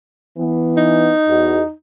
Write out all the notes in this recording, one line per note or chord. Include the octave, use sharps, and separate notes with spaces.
E3 B3
D#4
E2 F#4 D#5